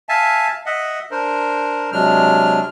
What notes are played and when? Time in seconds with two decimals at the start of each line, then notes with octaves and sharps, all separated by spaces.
0.09 E5 F5 G#5 A5
0.66 D#5 E5 F#5
1.11 D4 A#4 C5
1.92 C3 F#3 G#3 D4 F6